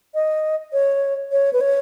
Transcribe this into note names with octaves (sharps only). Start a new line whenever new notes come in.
D#5
C#5
C#5
B4
C#5